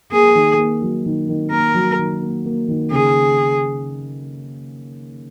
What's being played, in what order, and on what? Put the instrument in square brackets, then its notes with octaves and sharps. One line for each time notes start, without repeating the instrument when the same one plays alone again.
[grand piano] A#3 [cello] G#4
[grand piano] D#3
A#3
F#3
D#3
D#3
[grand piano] A#3 [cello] A#4
[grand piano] F#3
D#3
A#3
A#3
D#3
[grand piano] C#3 [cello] G#4